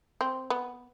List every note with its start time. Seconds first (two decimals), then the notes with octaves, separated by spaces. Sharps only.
0.21 C4
0.50 B3